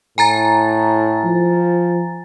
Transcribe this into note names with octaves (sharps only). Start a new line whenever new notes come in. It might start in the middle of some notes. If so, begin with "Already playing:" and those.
A2 G#5 A#5 A6
F3